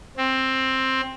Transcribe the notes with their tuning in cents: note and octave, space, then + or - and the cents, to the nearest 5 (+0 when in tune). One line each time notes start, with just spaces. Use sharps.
C4 +10